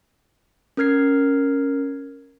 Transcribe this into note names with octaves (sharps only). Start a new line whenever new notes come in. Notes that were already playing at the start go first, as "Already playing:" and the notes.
C#4 A#4 F6 G#6 C7